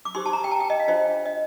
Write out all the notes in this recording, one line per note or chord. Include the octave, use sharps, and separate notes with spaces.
D6
D#4 G4 C5 C6
A5
A#5
G5
A5
G5
D#5
F5
D4 F4 C5 D#5
D#5